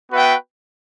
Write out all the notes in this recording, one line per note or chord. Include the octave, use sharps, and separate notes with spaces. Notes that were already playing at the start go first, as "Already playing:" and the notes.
B3 F#4 B4 E5 G5